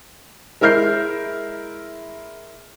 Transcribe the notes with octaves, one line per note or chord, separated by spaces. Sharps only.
G#3 E4 A#4 F6 G6 C7